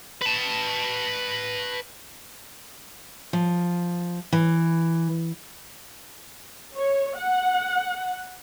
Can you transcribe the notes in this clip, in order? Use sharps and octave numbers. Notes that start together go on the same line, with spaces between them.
B4 A5
F3
E3
C#5
F#5